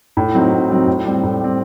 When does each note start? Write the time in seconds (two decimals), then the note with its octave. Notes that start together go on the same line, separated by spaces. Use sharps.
0.17 A2
0.34 F#3 C4 D#4
0.52 A2
0.70 F#3 C4 D#4
0.87 A2
1.05 G3 C4
1.23 A2
1.41 G3 C4